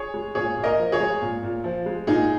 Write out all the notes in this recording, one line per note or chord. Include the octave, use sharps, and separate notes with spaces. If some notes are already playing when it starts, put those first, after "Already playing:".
Already playing: G#4 C#5
G#3
A#2 G#4 C#5
A#2
A#4 D#5
F3
G#4 C#5
G#3
A#2
A#2
F3
G#3
A#2 D#4 G#4